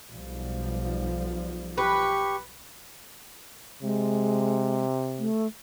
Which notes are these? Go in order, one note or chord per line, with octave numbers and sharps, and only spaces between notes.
B1 F3 G3
G4 B4 C#6
C3 G#3
A3